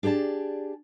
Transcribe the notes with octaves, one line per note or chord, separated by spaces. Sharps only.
D4 G4 G#4 D5 A5